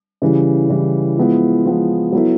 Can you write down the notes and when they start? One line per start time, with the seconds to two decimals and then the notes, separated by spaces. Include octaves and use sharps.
0.22 C#3 E3 G3
0.69 C#3 E3 G3
1.18 F3 G#3 B3 E4
1.66 F3 G#3 B3 E4
2.12 F#3 B3 E4 A4